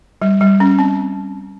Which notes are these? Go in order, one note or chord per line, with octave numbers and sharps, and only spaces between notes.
G3
G3
C#4
C4